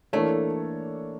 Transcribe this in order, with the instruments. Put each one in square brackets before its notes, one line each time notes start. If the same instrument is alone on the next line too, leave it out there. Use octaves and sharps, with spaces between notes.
[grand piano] E3 A#3 D4 A4 C#5 [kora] A3